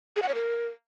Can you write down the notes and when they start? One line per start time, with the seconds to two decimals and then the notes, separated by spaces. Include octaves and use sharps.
0.16 G#4
0.22 F#5
0.28 C#5
0.35 A#4